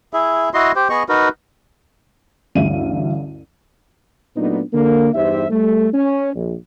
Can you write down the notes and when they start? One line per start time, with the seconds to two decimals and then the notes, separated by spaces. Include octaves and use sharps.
0.13 E4 G#4 E5
0.54 E4 F#4 D#5 C6
0.76 G4 C5
0.90 B3 G#4 D#5 C#6
1.09 D#4 F#4 A#4 B4
2.55 A1 D2 G2 E5 F5 D#7
4.36 A#2 F#3 A3 B3 D4 D#4
4.73 D3 A#3
5.14 E2 G2 D#4 G4 C5 E5
5.50 G3 A3
5.94 C#4
6.35 A#1